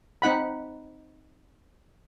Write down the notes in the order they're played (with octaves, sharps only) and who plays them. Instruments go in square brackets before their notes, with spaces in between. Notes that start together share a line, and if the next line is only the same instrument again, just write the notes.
[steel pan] C4 D#4 F#5 B5